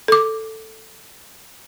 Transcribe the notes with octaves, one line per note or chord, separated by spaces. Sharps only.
A4 D6